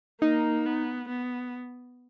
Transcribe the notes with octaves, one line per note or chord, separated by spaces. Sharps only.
A#3 D#4
B3
B3